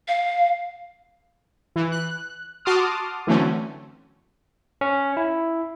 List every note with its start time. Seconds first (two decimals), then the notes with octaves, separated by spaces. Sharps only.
0.08 F5
1.76 E3
1.92 F#6
2.65 F#4 A5 C6 D6 D#6 F6
3.27 D3 E3 F#3 A3 C4 C#4
4.81 C#4
5.17 E4